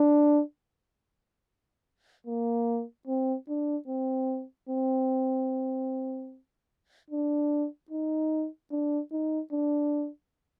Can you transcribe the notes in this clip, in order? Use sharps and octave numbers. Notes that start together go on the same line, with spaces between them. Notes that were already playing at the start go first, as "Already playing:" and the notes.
Already playing: D4
A#3
C4
D4
C4
C4
D4
D#4
D4
D#4
D4